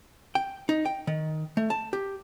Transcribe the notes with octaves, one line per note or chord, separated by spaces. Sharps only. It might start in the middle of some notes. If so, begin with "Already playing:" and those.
G5
D#4
G5
D#3
A3
A5
G4